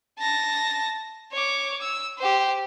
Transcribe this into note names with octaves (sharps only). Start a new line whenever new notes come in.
A5 A#6
C#5 D6
E6
G4 C5